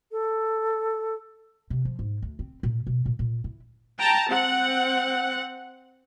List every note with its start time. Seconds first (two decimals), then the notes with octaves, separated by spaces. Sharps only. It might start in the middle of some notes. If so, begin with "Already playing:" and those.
0.12 A4
1.70 C3
1.85 F3
1.99 G#2
2.22 D2
2.39 C4
2.63 A#2
2.87 B2
3.06 A#2
3.19 A#2
3.44 E4
3.99 G5 A5 A#5
4.28 C4 F#5